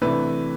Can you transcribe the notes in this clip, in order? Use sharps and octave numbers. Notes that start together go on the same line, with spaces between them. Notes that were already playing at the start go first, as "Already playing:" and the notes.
C3 E3 A3 D4 B4